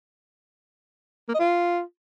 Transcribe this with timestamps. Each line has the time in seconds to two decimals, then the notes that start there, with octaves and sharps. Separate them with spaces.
1.29 A#3
1.34 D#5
1.40 F4